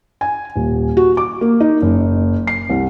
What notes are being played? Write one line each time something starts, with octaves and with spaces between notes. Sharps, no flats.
G#5
D#1
F#4
D6
A#3
D#4
F#1
C7
C2